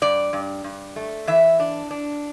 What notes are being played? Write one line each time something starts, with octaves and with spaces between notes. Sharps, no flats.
G2 D5
G2
G2
A3
E3 E5
D4
D4